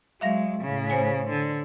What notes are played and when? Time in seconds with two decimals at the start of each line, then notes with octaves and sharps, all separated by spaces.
0.21 F#3 G#3 E5 F5 A#6
0.61 A2 C#3
0.90 C5 C#5 G#5
1.29 D3